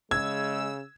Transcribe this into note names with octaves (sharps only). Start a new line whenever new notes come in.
C#3 G#3 E6 G#6